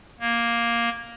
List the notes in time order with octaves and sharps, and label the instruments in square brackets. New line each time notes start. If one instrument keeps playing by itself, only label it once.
[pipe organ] A#3